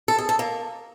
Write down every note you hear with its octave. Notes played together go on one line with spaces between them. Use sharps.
A4
G#4
A4
A#3